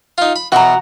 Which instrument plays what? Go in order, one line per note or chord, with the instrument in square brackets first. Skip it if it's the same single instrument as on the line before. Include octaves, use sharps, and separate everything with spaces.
[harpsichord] D#4 F4
B5
[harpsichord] B2 E3 [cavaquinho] F#4 A#5